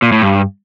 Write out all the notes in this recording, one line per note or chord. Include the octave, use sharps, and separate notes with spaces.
A#2
A2
G2